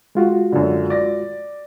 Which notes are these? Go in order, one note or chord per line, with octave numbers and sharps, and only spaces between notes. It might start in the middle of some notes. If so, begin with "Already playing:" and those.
G#3 F4 F#4
F#2 D3
D5 A#6